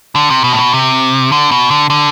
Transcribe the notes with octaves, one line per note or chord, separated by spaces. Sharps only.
D3
C3
B2
A2
B2
C3
D3
B2
D3
D3